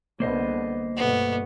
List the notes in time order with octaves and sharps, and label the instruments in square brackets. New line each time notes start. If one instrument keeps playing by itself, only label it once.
[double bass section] C2 D3 B3 [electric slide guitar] A#3 C5 D#5
[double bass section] G1 B2 A3 [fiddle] B3